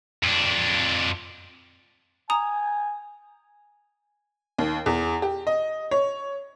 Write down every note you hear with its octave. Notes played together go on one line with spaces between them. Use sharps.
F2 D4
G#5 A#5 D#6
D#2
E2
G4
D#5
C#5